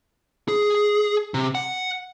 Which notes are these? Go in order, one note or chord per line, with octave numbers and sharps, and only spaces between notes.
G#4
C3
F#5